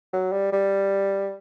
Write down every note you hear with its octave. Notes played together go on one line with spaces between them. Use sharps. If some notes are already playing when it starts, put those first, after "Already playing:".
F#3
G3
G3